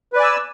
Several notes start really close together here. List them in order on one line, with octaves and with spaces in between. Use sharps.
B4 D5 G#5 E6